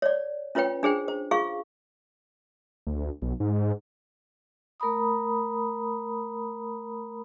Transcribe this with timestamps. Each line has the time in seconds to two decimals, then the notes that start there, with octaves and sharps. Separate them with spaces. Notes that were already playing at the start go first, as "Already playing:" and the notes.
0.02 C#5 D5
0.55 C#4 F4 B4 C#5 G5
0.83 D4 G#4 C5 G5
1.08 C5
1.31 F4 G#4 F5 C#6
2.87 D2
3.22 B1
3.40 G#2
4.80 A3 A#4 A#5 B5 D#6